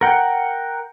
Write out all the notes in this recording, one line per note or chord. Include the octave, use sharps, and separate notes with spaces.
A#4 F#5 G5